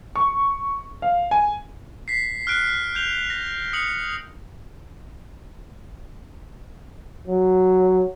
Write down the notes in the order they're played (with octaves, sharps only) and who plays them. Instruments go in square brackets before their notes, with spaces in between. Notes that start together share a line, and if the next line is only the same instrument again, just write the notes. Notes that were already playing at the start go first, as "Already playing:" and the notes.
[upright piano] C#6
F5
G#5
[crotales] B6 C7
F6 F#6 D7
G6 F7 G7
A#6
D#6 C#7 F#7
[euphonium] F#3